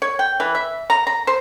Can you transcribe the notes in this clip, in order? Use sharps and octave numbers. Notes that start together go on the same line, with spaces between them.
C#5
G5
E3
E5
A#5
A#5
C5